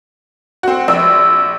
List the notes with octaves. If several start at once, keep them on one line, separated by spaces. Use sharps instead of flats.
C4 F#4
A#1 E6